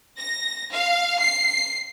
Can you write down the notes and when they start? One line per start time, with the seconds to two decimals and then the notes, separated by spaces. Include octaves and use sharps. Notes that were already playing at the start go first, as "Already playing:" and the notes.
0.18 A#6
0.72 F5
1.20 C7